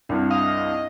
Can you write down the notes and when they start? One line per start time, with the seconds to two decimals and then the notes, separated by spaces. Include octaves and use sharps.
0.09 C2 G2 D4
0.31 D#5 F5